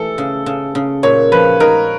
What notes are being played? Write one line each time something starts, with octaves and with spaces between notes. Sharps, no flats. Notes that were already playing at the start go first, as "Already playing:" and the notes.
Already playing: E3 A3 A4
C#3
C#3
C#3
A#2 C#5
F3 B4
D#4 A#4